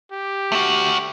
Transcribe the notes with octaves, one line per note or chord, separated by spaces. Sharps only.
G4
A3 F#4